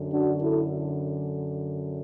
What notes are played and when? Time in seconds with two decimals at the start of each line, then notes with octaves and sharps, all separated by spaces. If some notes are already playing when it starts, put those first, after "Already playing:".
Already playing: F#2 D3
0.11 D4 F#4
0.40 E4 A4